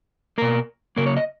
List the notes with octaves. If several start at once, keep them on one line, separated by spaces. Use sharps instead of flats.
B2 A#3 A#4
C#3 F#3 A#3 A#4
C#5
D#5